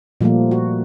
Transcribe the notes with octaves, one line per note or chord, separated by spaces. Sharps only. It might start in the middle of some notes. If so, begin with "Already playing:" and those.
A#2 F3 G3 A3 A#3
F#4